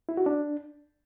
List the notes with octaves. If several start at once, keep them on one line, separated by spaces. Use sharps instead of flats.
E4
F#4
D4